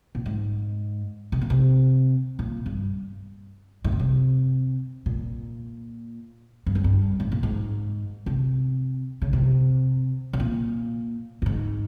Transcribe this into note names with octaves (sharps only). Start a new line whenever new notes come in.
A#2
G#2
C3
A#2
C3
A#2
G2
G#2
A#2
C3
A#2
G2
F2
G2
G#2
A#2
G#2
C3
C#3
C3
C3
A#2
G2
G#2